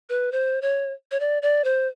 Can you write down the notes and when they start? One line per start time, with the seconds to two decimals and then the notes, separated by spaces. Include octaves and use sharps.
0.09 B4
0.32 C5
0.62 C#5
1.11 C#5
1.20 D5
1.42 D5
1.64 C5